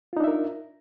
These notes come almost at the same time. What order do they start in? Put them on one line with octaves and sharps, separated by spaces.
F4 D#4 D4 E5 A#4